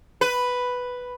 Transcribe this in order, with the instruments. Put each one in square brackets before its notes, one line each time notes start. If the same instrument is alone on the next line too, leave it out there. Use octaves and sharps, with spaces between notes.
[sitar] B4